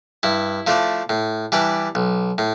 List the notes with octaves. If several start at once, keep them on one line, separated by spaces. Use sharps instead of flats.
G2 E4
F3 A3 D4
A2
E3 G3 D4
B1
A2